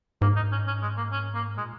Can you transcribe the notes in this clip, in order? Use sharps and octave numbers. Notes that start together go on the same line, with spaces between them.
G#2 A#3
D#4
C#4
C#4
G#3
A#3
C#4
A#3
A#2 G#3